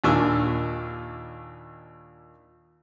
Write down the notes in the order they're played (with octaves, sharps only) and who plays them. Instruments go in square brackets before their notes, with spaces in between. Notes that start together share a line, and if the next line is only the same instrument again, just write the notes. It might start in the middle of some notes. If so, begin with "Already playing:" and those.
[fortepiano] D#2 A#2 D4 G#5 C#6 E6